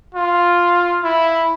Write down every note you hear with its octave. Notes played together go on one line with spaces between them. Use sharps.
F4
E4